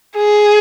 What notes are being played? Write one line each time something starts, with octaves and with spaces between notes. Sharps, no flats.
G#4